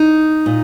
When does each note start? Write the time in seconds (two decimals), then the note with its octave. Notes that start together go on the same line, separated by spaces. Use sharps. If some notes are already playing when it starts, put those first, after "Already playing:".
Already playing: D#4
0.46 A#2